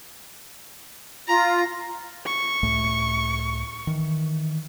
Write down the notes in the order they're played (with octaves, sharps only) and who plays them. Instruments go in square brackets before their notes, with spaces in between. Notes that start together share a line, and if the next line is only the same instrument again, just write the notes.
[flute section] F4 [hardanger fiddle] A#5
[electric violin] C#6
[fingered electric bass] C#2 A2 A3
D#3 E3